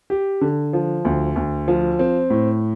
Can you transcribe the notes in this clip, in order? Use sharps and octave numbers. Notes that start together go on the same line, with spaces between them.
G4
D3
F3
D2
D2
F3
C4
A2